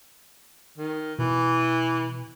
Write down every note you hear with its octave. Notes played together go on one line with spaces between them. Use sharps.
D#3
B2 E3